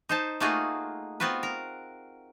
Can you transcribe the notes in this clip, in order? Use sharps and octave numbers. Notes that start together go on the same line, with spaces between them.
D#4 C5 A5
A3 A#3 D#4 F4 F#4 G#4
B3 C4 F4 F#4 B4
A#4